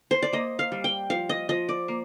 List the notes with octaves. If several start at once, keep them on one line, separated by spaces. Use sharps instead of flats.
C5
D5
A#3 D#5
F5
G3
G5
F3 F5
D#5
F3 D#5
D5
A#3